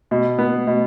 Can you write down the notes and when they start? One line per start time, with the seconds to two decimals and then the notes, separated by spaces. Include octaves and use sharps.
0.11 B2
0.39 B3
0.67 B2